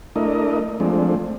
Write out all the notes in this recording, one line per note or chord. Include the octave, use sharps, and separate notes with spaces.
A3 D4 E4 A#4 D#5
F3 G#3 A3 C4 D4